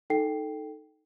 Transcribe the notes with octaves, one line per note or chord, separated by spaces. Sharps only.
D#4 A4 G5 C7